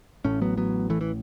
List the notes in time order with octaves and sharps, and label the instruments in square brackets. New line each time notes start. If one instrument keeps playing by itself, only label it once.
[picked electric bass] A1 A2 A3 C#4
F#3 B3
F#3 B3
E3 A3
E3